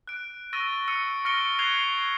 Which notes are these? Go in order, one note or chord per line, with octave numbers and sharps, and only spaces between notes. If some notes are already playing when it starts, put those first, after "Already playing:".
F#6 D7
C#6 E6 A6 A#6 D#7 G7
E6 C#7 D#7
C#6 F6 A#6 C#7 D7 G7
F#6 G#6 C7 F7 G7
C7